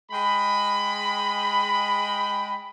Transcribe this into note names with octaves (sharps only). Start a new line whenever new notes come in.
G#3 G5 B5